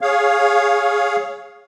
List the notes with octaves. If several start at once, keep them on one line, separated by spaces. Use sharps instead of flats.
G#4 C#5 F5